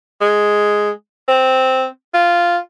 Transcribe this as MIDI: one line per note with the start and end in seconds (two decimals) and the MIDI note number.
0.21 0.90 56
1.28 1.86 60
2.14 2.58 65